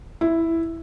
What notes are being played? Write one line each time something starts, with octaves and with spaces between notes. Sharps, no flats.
E4